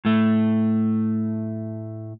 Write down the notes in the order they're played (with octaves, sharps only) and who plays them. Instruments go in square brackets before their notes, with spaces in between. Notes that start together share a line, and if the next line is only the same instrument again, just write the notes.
[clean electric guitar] A2 A3